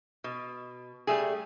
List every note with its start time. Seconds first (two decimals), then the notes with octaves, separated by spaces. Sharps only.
0.24 B2
1.07 G3 A3 G#4